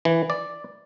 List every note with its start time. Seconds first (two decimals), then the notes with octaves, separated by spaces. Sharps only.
0.05 E3
0.30 D5